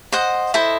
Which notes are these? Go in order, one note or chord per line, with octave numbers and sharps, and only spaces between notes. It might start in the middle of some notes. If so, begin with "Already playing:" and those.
C5 D#5 F#5
E4 A4 C5 D#5